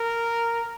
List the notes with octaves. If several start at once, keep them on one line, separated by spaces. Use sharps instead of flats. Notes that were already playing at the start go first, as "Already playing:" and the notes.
Already playing: A#4